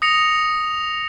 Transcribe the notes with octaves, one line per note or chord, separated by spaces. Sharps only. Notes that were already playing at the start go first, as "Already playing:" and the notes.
D#6 A#6 C#7 F7